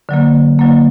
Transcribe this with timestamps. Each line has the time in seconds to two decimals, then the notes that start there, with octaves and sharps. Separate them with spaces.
0.09 D3 F#3 A#3
0.59 D3 F#3 A#3